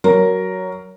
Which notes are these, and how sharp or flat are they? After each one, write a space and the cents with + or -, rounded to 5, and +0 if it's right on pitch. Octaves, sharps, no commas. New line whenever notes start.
F#3 +10 A#4 +0